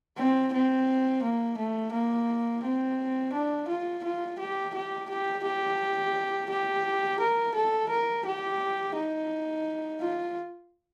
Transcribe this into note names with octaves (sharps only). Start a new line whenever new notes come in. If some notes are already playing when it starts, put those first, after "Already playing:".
C4
C4
A#3
A3
A#3
C4
D4
F4
F4
G4
G4
G4
G4
G4
A#4
A4
A#4
G4
D#4
F4